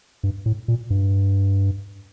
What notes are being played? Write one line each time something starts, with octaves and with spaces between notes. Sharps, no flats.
G2
A2
A#2
G2